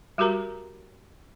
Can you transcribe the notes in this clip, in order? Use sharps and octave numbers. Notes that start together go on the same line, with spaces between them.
G3 F#4 G4 A#4 A#5